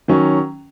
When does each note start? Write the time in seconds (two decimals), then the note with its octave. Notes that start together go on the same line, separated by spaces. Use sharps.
0.08 D#3 F#3 C#4